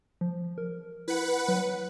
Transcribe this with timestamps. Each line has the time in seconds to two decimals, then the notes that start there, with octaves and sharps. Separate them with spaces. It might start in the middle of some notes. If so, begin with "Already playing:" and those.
0.21 F3
0.58 A#4
1.08 E4 B4 F#5
1.48 F#3